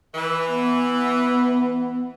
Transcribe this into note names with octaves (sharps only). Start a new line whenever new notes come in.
E3
B3